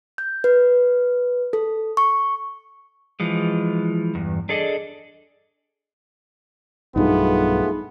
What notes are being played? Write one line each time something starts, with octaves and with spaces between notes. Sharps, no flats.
G6
B4
A4
C#6
E3 F3 G#3
E2 G2
D4 G#4 A4 D5 D#5
B1 G2 B2 A3 B3 D#4 F4 G#4